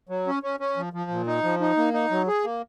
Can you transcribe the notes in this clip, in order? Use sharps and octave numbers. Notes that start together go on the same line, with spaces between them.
F#3
C#4
C#4
C#4
F3
F3
A#2
D#4
F3
D#4
A#3
D#4
F#3
G#4
A#3